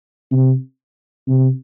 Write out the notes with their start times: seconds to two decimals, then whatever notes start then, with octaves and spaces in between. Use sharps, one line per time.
0.31 C3
1.27 C3